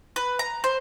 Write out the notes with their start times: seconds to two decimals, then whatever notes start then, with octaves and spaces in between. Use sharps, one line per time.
0.16 B4
0.39 A#5
0.64 C5